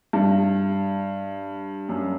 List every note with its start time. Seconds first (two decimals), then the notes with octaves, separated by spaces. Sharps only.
0.13 G2
1.89 F#2